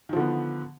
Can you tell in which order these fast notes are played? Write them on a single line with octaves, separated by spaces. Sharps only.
D#3 F3 D3 B3